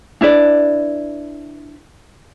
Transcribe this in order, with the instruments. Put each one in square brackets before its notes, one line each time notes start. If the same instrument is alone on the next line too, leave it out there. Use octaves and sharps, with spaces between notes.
[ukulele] D4 E4 B4 D5